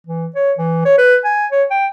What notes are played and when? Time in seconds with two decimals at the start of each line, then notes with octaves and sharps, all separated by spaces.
0.07 E3
0.35 C#5
0.58 E3
0.85 C#5
0.98 B4
1.25 G#5
1.52 C#5
1.71 G5